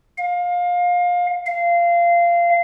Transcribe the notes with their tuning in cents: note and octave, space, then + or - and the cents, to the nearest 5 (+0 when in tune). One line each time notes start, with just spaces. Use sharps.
F5 +25
F5 -20